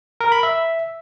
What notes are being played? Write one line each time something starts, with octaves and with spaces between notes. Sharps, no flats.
A#4
B5
E5